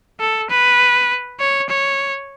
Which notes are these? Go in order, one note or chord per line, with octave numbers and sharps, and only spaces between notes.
A4
B4
C#5
C#5